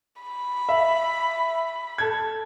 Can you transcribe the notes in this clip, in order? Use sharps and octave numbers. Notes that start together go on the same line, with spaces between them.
B5
E5
A4 G#6